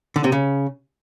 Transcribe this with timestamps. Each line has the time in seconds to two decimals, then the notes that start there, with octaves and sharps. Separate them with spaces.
0.16 D3
0.24 C3
0.32 C#3